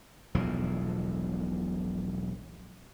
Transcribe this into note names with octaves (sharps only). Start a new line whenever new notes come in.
E1 B1 A2 F3